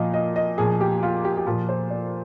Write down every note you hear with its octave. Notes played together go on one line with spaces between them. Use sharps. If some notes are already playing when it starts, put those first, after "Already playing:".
Already playing: A#2 F3 D#5 F5
D#5
D#5
A#2 F3 G#4
G4
F4
G4
G4
A#2 F3 F4
C5
D5